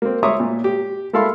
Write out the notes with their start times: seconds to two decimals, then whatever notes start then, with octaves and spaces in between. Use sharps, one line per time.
0.02 A#3 C4
0.23 C#5 E5 A#5 C6 D6 D#6
0.40 A#2
0.64 G4
1.13 A#3 E4 A4 F5 B5 C6